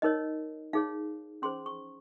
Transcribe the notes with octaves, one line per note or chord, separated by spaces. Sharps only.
D#4 A#4 C#5 D#5
D#4 G#4 C#5 F5
C#4 G#4 C5 C6
C#6